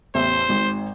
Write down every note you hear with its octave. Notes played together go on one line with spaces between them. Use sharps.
A1 E2 C5 E5
G#1 G#2